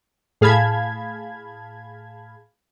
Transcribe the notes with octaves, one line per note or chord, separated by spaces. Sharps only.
A2 G#4 F5 A5 B5 G#6